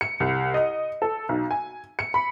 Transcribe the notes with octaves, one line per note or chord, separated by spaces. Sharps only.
C#7
C2
D#5
A4
B1
G#5
C#7
B5